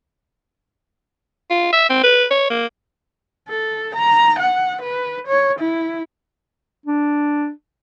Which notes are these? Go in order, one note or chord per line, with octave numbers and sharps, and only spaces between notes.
F4
E5
C4
B4
C#5
A#3
A4
A#5
F#5
B4
C#5
E4
D4